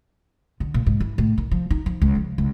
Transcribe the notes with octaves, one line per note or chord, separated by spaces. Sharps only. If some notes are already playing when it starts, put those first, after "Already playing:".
D3
A#2
G#2
E3
A2
D#3
F3
D#4
F3
C#2
F3
C#2